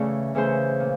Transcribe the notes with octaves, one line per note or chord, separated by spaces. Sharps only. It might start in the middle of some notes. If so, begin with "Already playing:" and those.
Already playing: C#3 E3 A3 C#4 D5
C#3 E3 A3 C#4 C5
A#2